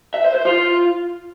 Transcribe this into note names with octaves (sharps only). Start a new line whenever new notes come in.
E5
C5
C5
F4